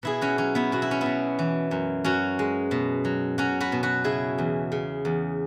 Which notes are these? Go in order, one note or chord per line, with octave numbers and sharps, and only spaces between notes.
B2 E4 G#4
C#4 F#4
F#3 C#4
B3 E4
B2 F#4
E4
C#4
B2 B3 E4
E3
F#2
F#2 C#4 F#4
G#3
B2
F#3
F#3 C#4 F#4
F#4 B4
B2
F#4 B4
C#3 E4 G#4
E2
C#3
E2